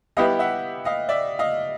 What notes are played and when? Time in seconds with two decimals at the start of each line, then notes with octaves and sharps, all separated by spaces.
0.17 G3 B3 E4 G4 B4 D#5 F5
0.39 E5 F#5
0.85 D#5 F5
1.09 D5 E5
1.39 D#5 F5